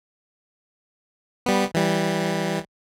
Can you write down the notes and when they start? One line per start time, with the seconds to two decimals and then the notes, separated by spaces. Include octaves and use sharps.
1.46 G3 B3
1.74 E3 G3